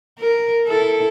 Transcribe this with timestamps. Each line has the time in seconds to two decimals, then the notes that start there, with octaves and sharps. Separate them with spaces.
0.18 A#4
0.67 E4 A4